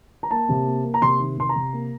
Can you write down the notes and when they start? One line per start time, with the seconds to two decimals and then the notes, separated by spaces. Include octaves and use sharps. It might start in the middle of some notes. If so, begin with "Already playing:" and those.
0.23 A#5
0.31 A#3 A5
0.49 C3
0.66 A#3
0.84 A#3
0.94 A#5
1.01 C3 C6
1.20 D#3
1.37 C3 C6
1.49 A#5
1.55 C3
1.73 A#3